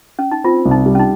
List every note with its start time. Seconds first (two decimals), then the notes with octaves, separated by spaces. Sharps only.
0.19 C#4
0.32 D#4
0.44 C4 F4
0.65 C2
0.71 D#4
0.86 G3
0.95 C#4
0.99 D#4